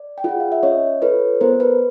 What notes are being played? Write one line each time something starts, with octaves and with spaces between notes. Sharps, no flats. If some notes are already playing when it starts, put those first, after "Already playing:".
Already playing: D5
G5
F4 G#4 F#5
F5
E5
C#4 C#5 D#5
F4 A4 B4 C#5
B3 A#4 C5
B4